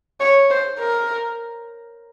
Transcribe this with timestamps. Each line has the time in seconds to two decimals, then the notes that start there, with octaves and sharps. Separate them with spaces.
0.20 C#5
0.50 C5
0.79 A#4